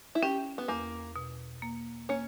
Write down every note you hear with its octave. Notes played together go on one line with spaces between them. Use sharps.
E4
C#4 G4
B3
E2 A#3
B2
A#3
A#3 C#4